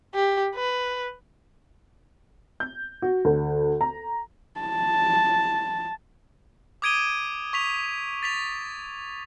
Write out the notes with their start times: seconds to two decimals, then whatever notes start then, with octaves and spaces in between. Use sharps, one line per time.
0.15 G4
0.55 B4
2.60 G6
3.02 F#4
3.25 D2
3.81 A#5
4.60 A5
6.82 D6 D#6 G#6 D7 D#7 G7
7.53 C#6 B6 F7
8.23 A6 B6 F7